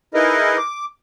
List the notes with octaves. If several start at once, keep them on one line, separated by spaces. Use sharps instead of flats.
D#4 E4 G#4 A#4 B4 D#5
D6